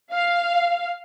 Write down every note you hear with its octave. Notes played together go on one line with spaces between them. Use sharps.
F5